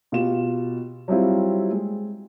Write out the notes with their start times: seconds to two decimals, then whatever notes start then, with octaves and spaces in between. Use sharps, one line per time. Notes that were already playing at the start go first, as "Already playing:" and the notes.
0.12 B2 F4 G4 E7
1.08 F#3 G3 C4 E4 F4
1.71 G#3